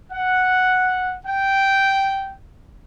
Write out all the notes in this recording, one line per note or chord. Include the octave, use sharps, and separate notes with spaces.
F#5
G5